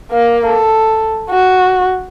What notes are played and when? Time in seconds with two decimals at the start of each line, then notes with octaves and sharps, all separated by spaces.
0.11 A#3 F5
0.46 A4
1.30 F#4